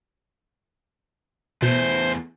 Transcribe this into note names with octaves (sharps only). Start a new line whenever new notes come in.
E2 B2 A3 C5